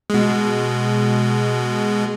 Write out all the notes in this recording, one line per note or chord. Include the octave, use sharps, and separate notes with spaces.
B2 G#3